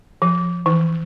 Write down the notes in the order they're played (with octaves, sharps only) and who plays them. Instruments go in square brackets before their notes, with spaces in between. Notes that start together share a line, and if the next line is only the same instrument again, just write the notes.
[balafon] F3
E3